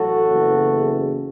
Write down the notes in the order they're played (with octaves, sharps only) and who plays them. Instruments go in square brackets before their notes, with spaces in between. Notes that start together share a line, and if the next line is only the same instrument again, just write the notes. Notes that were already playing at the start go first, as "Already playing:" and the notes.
Already playing: [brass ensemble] A1 A2 F#3 F#4 A4
F#1 E2 C#3